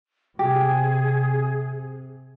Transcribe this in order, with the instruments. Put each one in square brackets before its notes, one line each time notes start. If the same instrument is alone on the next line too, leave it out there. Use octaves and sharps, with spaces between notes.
[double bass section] C3 [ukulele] G4 [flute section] G#4